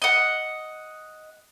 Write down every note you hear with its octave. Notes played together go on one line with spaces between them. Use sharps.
D#5 F#5